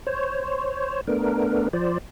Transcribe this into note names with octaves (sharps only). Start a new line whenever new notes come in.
C5 C#5
A3 B3 D4 A#4
F3 C5 D5